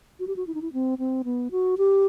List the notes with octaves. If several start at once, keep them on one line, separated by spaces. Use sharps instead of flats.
F#4
G4
F#4
E4
D#4
E4
C4
C4
B3
F#4
G4